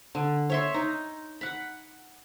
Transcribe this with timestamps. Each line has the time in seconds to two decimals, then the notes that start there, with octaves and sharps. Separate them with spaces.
0.15 D3
0.49 C#5 E5 C6
0.74 D#4
1.41 F#5 B5